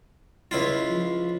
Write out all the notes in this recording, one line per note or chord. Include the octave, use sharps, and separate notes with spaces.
C#2 E4 F4
F3